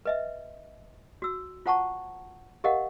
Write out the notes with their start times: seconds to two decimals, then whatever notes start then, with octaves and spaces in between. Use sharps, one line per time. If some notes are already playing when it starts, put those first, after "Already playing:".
0.05 B4 D#5 E5
1.22 F#4 E6
1.66 F4 C5 F#5 A5 A#5 C#6
2.64 G4 A#4 D#5 F5 F#5